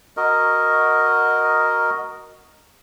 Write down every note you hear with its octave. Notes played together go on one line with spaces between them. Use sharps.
F#4 A#4 D#5